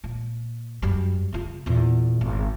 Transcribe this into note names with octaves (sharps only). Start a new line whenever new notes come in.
A#2
F#2 G3
C#3 F4
E2 A#2
G#1